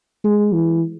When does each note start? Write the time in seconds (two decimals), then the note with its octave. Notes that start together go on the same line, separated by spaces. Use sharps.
0.24 G#3
0.53 E3